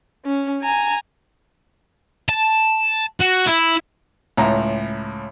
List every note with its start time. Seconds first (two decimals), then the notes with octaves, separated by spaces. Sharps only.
0.25 C#4
0.63 G#5 A#5
2.29 A5
3.21 F#4
3.47 E4
4.37 C#2 A2 A#5